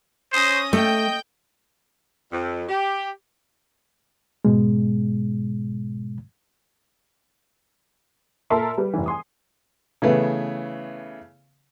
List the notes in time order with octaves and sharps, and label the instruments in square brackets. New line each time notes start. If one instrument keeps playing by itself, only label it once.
[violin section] C#4 D#6 A#6 [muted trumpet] C5
[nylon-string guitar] A3 [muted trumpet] D#5 [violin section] G5 G6
[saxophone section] F2
G4
[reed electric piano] G#2 B2 G#3
[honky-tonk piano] A#2 A4 A#4 E5 A5 C6
G3 B4
F1 E3
G#5 C6 D#6
[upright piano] C#3 E3 A3 B3